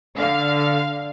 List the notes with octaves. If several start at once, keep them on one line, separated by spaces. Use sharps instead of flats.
D3 F5